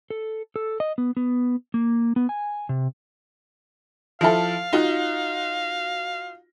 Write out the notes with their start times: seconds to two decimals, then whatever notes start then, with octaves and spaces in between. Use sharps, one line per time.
0.10 A4
0.56 A4
0.80 D#5
0.98 B3
1.17 B3
1.74 A#3
2.16 B3
2.29 G#5
2.69 C3
4.21 F3 E4 A4 F5
4.73 D#4 F4 F#4